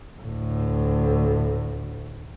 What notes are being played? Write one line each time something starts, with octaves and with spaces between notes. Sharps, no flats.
D2 A2